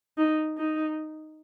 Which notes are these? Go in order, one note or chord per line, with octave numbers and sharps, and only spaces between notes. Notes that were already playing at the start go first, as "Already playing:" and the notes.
D#4
D#4